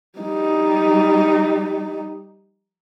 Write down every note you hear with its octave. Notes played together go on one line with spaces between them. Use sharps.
G3 D#4